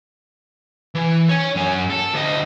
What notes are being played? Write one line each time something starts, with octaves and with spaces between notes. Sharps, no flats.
E3
C#5 G#5
F#2 G#5
A4
D2 D#5